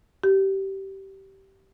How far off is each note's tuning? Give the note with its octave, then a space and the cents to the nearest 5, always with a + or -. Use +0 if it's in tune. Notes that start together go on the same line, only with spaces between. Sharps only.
G4 -20